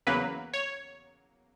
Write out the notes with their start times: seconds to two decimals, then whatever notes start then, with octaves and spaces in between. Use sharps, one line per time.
0.07 E2 C#3 F#3 A#3 B4
0.53 C#5